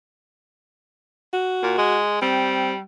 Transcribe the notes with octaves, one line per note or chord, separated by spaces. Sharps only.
F#4
A#2
G#3
G3 C4